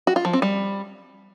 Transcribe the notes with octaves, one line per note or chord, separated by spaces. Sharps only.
F#4
F4
F3
C4
G3